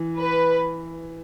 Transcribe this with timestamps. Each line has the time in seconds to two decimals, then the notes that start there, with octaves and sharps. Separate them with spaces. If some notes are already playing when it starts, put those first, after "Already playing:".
Already playing: E3
0.18 B4